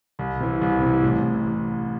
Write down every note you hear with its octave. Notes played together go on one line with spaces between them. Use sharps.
C2
C3 E3
C2
C3 E3
A1